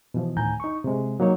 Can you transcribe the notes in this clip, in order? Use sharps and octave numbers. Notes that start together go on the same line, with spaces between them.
B2 E3 F3
D2 A2 D#3 G#5 A#5 G6
D#4 C#6
C3 G#3
F#3 A#3 D#4 C#5